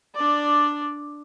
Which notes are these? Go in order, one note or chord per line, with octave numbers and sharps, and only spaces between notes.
D4 D5